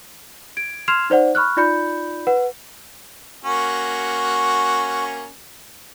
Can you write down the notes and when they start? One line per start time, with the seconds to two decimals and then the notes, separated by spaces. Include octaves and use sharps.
0.57 G#6 D7
0.88 C6 F6 G#6 C7 E7 F7
1.10 D#4 C5 D5 F#5
1.35 B5 C#6 F6 F#6
1.57 D#4 F4 D5 B5 G6 C#7
2.27 B4 F#5
3.45 A#3 C#4 F#4